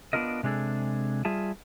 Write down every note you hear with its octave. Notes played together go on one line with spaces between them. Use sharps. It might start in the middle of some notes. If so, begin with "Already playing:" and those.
B3 D4 D#4 F4 A#4 D#5
C3 G#3 D4 G#4 A4
G3 F4 G#4 E5 A5